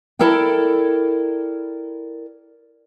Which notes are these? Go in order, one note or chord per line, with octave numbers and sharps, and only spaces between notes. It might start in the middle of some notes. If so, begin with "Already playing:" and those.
E4 A4 A#4 D5 G5